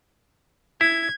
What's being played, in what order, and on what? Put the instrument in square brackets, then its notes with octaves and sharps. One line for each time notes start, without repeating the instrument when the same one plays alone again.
[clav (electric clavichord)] E4 [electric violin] G#6